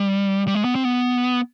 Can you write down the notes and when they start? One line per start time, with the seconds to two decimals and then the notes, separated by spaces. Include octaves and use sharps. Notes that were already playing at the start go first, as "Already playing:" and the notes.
Already playing: G3
0.47 G3
0.55 G#3
0.64 B3
0.75 C4
0.85 B3